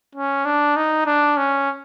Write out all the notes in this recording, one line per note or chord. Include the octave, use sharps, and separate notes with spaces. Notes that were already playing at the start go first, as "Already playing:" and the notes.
C#4
D4
D#4
D4
C#4